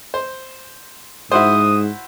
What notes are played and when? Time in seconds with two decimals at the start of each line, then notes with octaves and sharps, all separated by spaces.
0.14 C5
1.32 G#2 E4 F#4 C5 D#6